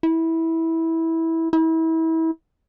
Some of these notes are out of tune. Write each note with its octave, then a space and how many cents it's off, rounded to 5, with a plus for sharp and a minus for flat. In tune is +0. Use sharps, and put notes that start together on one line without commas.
E4 -15
E4 -30